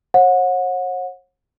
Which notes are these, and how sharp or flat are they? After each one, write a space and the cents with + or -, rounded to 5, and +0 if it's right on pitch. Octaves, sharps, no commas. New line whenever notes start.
C#5 -40 F#5 -30